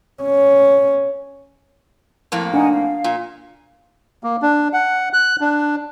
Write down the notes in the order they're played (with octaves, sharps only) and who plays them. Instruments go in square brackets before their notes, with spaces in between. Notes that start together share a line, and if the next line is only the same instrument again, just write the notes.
[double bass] C#4
[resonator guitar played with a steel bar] F2 A2 A#3
[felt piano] D4 [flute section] D#4 F#5 G#5
[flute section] F5
[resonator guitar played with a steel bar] A#2
[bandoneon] A#3
D4
F#5
F#6
D4